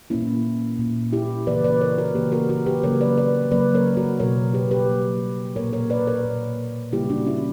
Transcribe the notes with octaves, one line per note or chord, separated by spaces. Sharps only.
A#2 A#3 C#4 E4
A#2 A#3
E4 G4
C#3 E3 A#3 B4 D5
B4 D5
A#4 C#5
F#4 A#4
C#3 E3 A#3 G4 B4
F#4 A#4
F#4 A#4
G4 B4
C#3 F#3 A#3 A#4 C#5
B4 D5
B4 D5
C#3 F#3 A#3 B4 D5
A#4 C#5
F#4 A#4
B2 F#3 A#3 A#4 C#5
G4 B4
G4 B4
B2 F#3 A#3
A#2 A#3 A#4 C#5
A#4 C#5
B4 D5
A#4 C#5
A#2 A#3
C#3 G3 A#3 E4 G4
D4 F#4
C#4 E4